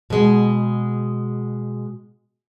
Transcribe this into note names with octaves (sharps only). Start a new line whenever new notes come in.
B2 G#3